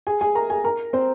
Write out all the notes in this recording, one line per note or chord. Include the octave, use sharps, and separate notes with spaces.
G#4 G#5
G#4 G#5
A#4 A#5
G#4 G#5
A#4 A#5
C4 C5